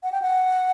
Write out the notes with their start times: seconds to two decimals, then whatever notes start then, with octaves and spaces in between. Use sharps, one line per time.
0.03 F#5
0.12 G5
0.22 F#5